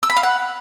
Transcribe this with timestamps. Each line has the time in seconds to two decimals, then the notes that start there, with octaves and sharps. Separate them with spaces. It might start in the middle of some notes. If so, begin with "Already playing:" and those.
0.03 E6
0.10 B5
0.16 F5
0.23 F#5